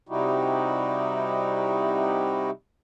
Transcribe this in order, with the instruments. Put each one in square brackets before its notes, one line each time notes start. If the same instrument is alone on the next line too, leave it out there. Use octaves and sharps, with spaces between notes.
[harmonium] C3 G3 D#4 E4 F#4 G4